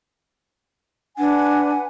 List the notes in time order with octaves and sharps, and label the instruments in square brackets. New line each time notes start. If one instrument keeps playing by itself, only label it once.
[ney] D4 [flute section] B4 F#5 G#5